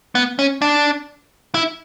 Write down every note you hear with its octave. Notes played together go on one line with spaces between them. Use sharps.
B3
C#4
D4
E4